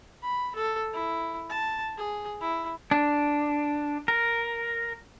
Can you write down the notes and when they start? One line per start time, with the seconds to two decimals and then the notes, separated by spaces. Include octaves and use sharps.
0.23 B5
0.55 A4
0.93 E4
1.50 A5
1.97 G#4
2.41 E4
2.91 D4
4.08 A#4